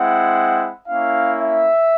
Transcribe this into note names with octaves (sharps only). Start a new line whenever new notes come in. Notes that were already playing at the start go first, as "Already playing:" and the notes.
Already playing: G#3 C4 E4 F#5
A#3 C#4 E4 F5
E5